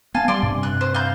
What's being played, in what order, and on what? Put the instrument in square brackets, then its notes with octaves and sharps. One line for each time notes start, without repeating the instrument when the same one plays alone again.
[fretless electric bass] B3 [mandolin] F5 G#5 A5
[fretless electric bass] G3 [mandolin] D5 C6
[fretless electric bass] G2 C3
[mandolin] F#6
C5
F5 G6